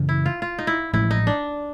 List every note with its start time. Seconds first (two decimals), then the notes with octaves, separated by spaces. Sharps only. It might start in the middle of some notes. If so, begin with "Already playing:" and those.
Already playing: F#2 C#3 E3
0.09 E4
0.26 F4
0.42 F4
0.59 D#4
0.67 E4
0.93 A1 A2 F3 G#3 E4
1.11 D#4
1.27 D4